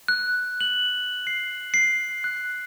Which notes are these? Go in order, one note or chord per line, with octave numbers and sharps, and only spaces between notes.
F#6
F#7
C7
C7
F#6